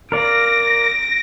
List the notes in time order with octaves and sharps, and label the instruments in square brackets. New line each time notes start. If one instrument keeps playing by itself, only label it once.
[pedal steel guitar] A#4 D5 F5 [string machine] A#6 [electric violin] D7